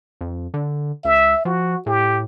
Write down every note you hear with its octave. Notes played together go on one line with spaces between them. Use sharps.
F2
D3
C#2 E5
F3 F#4
A2 G4